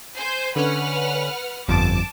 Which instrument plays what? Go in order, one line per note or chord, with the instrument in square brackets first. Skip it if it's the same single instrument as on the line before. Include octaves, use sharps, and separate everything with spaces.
[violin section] C5 G#5 G6
[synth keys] D3 C#4 [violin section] B4 F#5 F6
[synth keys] G1 F2 [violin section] A5 D6